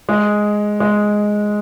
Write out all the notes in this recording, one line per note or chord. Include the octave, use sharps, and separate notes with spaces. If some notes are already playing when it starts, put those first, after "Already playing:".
G#3
G#3